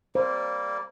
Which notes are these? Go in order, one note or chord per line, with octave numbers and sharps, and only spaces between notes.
G3 A#3 C5